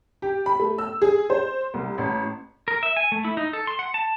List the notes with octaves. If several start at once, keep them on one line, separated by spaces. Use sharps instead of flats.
G4
B5
A3
E6
G#4
C5
C2
A1
A#4
E5
G#5
A3
E4
D#4
A4
C6
F#5
A5